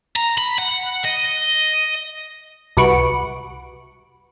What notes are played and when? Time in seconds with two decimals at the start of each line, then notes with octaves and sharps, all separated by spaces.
0.16 A#5
0.38 B5
0.58 F#5
1.05 D#5
2.77 C2 F#4 B4 C#6 D7